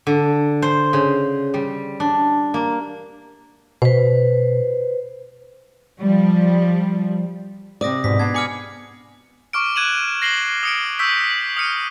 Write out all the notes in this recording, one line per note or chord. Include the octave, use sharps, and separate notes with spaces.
D3
C5
C#3
G3
D4
A#3
B2 B4 C5
F3 G3
C3 D5 D6 D#6 A#6
G#2 B2 B6
B3 D4 G#6 C7
G#5 B5 D6 F6 C#7
C#6 D6 F6 D7
F#6 G#6 D#7 E7 F#7
A#6 C7 F#7 G7
D#6 C#7 D7
C#6 E6 G6 B6
D#6 F6 C#7 D#7